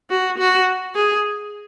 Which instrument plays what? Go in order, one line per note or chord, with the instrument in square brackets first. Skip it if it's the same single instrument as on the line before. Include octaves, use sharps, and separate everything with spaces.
[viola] F#4
F#4
G#4